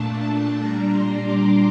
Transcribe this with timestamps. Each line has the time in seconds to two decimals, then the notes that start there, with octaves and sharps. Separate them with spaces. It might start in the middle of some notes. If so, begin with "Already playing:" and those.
Already playing: A#2 A3 D4 A5
0.58 A#2 G3 D4 A#5
0.88 C6
1.19 D6